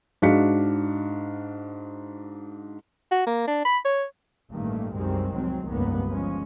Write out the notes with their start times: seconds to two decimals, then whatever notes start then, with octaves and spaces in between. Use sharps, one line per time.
0.22 G#2 D4 F#4 F5 B6 C#7
3.11 F#4
3.26 A#3
3.47 D4
3.65 B5
3.85 C#5
4.51 A1 G2 D#3 A3 A#3
4.96 C2 F#2 D#3 G3 G#3 C4
5.34 F1 C2 F#3 C4
5.66 F1 C#2 G2 D#3 A#3 B3
6.10 G1 F3 G#3 C#4